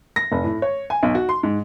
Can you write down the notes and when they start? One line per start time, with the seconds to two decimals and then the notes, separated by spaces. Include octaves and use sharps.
0.16 A#6
0.32 F1
0.44 A2
0.62 C#5
0.90 G#5
1.03 B1
1.15 F#4
1.29 C6
1.43 G#2